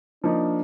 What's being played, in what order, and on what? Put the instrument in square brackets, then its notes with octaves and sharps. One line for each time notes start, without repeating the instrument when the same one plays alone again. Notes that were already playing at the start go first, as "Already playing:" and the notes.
[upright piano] F3 A#3 D#4 [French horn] D4